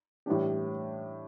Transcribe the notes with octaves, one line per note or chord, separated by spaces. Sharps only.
A2 E3 G3 D4 G4